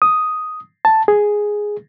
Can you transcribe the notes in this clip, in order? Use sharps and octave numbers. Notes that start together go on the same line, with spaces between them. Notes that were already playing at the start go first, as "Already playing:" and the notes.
D#6
A5
G#4